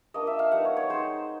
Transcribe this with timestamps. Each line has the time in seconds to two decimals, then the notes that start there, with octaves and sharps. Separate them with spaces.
0.14 A#3 D4 F4 D#5
0.27 E5
0.39 F5
0.52 G3 B3 D#4 F#5
0.65 C#5
0.77 C#5
0.89 G#3 C4 D#4 C5